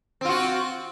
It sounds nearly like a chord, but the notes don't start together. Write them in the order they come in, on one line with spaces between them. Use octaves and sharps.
C4 F4 F#4